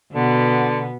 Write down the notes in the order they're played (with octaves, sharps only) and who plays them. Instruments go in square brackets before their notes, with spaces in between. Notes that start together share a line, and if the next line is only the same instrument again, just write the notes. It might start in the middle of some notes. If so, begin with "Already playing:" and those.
[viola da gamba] B2 B3 [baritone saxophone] D3